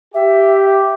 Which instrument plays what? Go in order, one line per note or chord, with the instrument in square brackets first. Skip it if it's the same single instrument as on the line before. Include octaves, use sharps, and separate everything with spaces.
[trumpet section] G4 [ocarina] E5